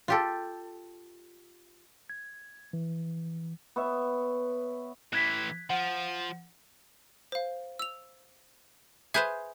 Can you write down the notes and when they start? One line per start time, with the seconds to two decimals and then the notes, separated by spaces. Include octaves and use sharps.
0.08 F4 G4 A4
2.10 G#6
2.73 E3
3.76 B3 C#5 E5
5.13 A2 E3 F#6 G#6 B6
5.70 F3 F#5
7.32 C5 F5
7.79 E6 F7
9.14 G#4 B4 C5 E5 G#5 G6